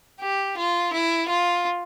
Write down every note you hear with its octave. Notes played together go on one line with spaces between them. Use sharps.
G4
F4
E4
F4